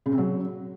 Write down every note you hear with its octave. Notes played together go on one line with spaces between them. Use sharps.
C#3
C3
F#3